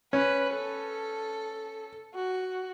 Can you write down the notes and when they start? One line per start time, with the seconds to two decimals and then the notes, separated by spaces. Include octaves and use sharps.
0.13 C#4 B4
0.53 A4
2.14 F#4